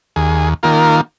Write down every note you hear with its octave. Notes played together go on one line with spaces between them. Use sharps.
D#2 G#4
D#3 A#3 F4 A#4